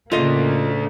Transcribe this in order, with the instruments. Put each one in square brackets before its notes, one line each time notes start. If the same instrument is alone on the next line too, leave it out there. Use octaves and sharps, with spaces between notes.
[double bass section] A2 C#3 A#3 [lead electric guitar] A3 D4 [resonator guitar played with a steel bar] F4 D#5